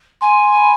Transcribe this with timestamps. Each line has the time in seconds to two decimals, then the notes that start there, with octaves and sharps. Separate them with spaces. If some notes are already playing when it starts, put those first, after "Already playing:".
0.21 G#5 C6
0.56 B5